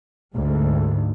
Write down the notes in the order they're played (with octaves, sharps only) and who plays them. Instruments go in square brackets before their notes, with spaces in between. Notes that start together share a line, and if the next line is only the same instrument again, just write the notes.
[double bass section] D2 G#2